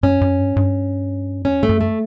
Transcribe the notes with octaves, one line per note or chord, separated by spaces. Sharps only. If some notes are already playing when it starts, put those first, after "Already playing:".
F#2 C#4
F#2
G2
G2
F#2
E2 C#4
G2 A3
F#2
A3